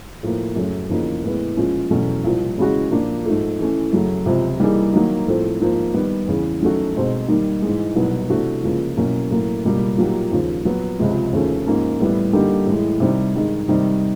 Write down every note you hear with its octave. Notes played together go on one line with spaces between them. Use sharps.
A2 F3 A#3
F#2 C#3 F#3 A3
E2 C#3 F3 A#3 D#4
A2 E3 G#3 B3
A#2 F3 G#3 C#4
E2 B2 F#3 A3 C#4
C2 A#2 F3
C#3 E3 G#3 C#4 F#4
A#2 F3 A#3 D4
G#2 F3 A3
E3 A3 C#4
F#2 C#3 F#3 A3
C#2 C3 F3
E3 G3 A#3 D#4 G#4
D#3 F#3 A#3
A2 F3 A3 C4
G#2 F3 A#3
D#3 G3 B3
E2 C#3 E3
D#3 F#3 A3 C#4 F#4
B2 G#3 C4 D#4
D#3 G3 A#3 D#4
G#2 E3 G#3
C2 B2 F#3 B3 D#4
C3 E3 A3 D4 F#4
C#2 C#3 F3 A#3
B2 F#3 A#3 C#4 E4
A2 F#3 A#3
C#2 B2 G3 A#3
A#2 F#3 A#3 D#4 G4
D#2 C#3 F3
A#2 F#3 B3
C#2 C3 F3 G#3
D#2 C#3 F3 A3 C#4
G#2 F3 A#3 C#4
A2 E3 G3 B3 E4
D3 G3 A#3 D#4 G4
A2 E3 G#3
C3 D#3 G3
G2 D#3 G#3
C3 D#3 G3